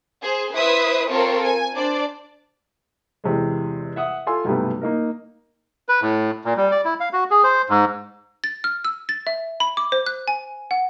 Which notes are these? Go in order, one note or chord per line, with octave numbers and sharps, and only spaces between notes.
G#4 C5
E4 B4 C5 E5 D#6
C4 F4 A4 A#4 C5 C#5
G#5
D4 C5 D5
E2 C3 G#3
E5 F#5 D#6
F4 A4 G#5 C6 E6
B1 G2 C3 G3 A3 B3
A#3 D#4 A#4
B4
A2
A#2
G3
D5
E4
F5
F#4
G#4
C5
G#2
A6
F6
E6
A6
E5
B5
D6
C5
F#6
G#5
F#5